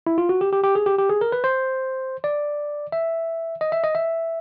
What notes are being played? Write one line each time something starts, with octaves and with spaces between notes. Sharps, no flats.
E4
F4
F#4
G4
G4
G4
G#4
G4
G4
G#4
A#4
B4
C5
D5
E5
D#5
E5
D#5
E5